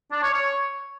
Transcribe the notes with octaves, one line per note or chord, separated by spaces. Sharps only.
D4
C#5
C#5